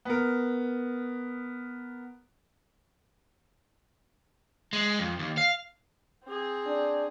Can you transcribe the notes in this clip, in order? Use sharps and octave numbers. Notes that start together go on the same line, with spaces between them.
B3 A#4
G#3
F2
D#2
F5
C4 G#4
D4